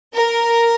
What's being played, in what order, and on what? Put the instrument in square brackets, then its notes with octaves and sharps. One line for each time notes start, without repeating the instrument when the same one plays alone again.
[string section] A#4